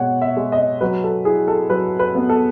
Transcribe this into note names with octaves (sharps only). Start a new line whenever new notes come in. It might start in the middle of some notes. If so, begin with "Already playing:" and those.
Already playing: B2 G#3 C#5 F#5
E5
G#3
D#5
F#3 B4
A4
E4 G#4
A4
F#3 B4
B4
B3
A4